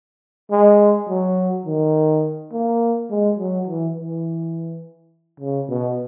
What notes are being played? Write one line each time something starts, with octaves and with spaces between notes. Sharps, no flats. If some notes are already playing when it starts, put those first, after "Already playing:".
G#3
F#3
D#3
A#3
G#3
F#3
E3
E3
C#3
B2